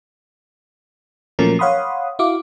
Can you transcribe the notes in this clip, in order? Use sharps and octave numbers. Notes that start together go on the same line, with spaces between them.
A#2 F3 F#3 A3 C#4 A#4
C#5 F5 F#5 B5 C6 D#6
E4 F#4 F5 D6